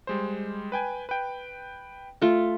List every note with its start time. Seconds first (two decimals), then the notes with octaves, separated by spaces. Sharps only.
0.07 G3 G#3 C5
0.72 B4 G5 G#5
1.09 B4 G5
2.22 A3 F4